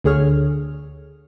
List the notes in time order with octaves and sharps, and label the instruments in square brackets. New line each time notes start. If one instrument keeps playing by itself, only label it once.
[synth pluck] D2 D3 G#4 C#5 F6